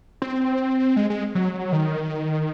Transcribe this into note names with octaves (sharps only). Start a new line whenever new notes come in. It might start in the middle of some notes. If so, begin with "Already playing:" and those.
C4
G#3
G#3
F#3
D#3